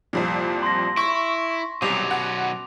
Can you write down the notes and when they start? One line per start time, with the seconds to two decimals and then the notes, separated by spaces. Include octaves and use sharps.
0.13 C2 F2 A#2
0.63 C6 A#6
0.97 E4 C#6
1.82 C2 B2 F#3 C#4 D6 F7
2.11 F#5